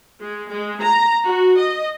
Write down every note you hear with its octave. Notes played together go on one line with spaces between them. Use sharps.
G#3
G#3
A#5
F#4
D#5